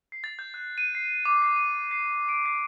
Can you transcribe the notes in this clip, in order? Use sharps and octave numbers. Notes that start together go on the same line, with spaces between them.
C7
A6
G6
F#6
D#7
C7
D6
C7
D#7
C7
D7
C7